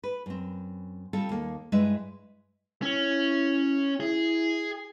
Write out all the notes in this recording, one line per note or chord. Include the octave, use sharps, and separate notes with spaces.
B4
F#2 C4
G3 C4 F4 A4
D#2 A#3
G2 G#3 E4 B4 E5
C#4 E4
E4 G#4